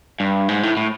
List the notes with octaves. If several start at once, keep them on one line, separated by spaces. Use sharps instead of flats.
G2
G#2
A2
A2